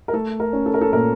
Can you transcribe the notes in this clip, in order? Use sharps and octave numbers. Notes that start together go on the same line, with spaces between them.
A#4
A3 A4
A#4
C#4
A4
A#4
A4
A#2 A#4